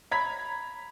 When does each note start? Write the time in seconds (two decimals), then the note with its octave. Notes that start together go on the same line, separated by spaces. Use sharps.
0.11 A#5 B5 G#6 B6